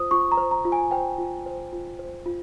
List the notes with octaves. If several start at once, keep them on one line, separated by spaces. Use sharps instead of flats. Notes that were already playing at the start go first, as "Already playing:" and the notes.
Already playing: F4 C5 D#6
F4 C#6
A#5
C5
A#5
F4
G#5
C5 G5
F4
C5
F4
C5
F4